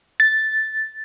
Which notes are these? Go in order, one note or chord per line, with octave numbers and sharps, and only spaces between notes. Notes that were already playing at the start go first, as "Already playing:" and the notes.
A6